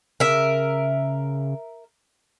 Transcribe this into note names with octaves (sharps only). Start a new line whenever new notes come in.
C#3 A#4 E5